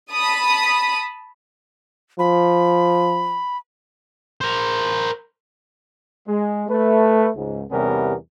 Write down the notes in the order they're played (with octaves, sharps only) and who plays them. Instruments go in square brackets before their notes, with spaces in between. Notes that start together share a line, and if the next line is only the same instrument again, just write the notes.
[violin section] A5 B5 D#6
[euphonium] F3 [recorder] B5
[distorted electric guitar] A#4 C5
[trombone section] G#3
A3 B4
C#2 G#2
E2 C3 G3 B3 C#4 A#4